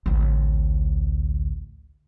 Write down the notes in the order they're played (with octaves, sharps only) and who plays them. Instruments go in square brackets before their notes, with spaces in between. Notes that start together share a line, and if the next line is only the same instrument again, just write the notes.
[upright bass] A1 D2